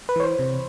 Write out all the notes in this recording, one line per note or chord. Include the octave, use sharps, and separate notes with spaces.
B4
E3 C#5
C5
C3